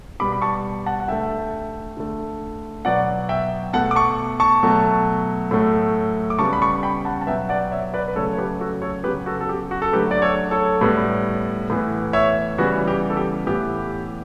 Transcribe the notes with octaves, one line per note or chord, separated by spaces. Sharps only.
B2 G3 B3 B5 D6
B5
A5 C#6
F#5 A5
F#5
D3 A3 E5 G5
D3 A3
B2 F#3 B3 D5 F#5
E5 G5
B2 A3 F#5 A5
D6
A5 C#6
A5 C#6
B2 F#3 A3
A2 F#3 A3
D6
C#3 G3 B3 A5 C#6
B5
A5 C#6
G5 B5
F#5 A5
A5
B2 F#3 B3 E5 G5
D5 F#5
C#5 E5
B4 D5
B4
C#3 F#3 A3 A4 C#5
C#5
G4 B4
F#4 A4
A4 C#5
C#3 F#3 B3 G4 B4
F#4 A4
A4
G4
F#4
A4
D3 F#3 A3 G4 B4
D5
A4 C#5
A4 C#5
A2 G3 B3
A2 E3 B3
C#5 E5
C#3 E3 G3 B3 F#4
G4
A4
G4
A2 E3 B3 G4